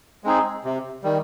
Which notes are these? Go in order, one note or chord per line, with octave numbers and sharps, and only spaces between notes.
G#3 C4 D#4 G#4
C3
D#3 G3